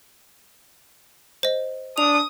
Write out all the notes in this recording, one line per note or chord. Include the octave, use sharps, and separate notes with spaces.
C5 D#5
D4 D#6 F7